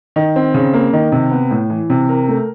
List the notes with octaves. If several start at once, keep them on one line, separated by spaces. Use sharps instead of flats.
D#3
C4
C#3
A#3
D#3
C3
B3
A2
E3
C3
A#4
A3